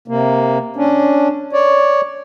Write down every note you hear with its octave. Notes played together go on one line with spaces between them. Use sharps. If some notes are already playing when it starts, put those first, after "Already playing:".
C3 A#3
C#4 D4
C#5 D5